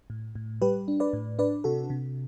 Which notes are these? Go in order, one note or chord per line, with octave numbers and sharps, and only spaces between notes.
A2
A2
G3 G4 B4
D4
B4 D5
A2
D4 B4 D5
C3 F#4 A4
C3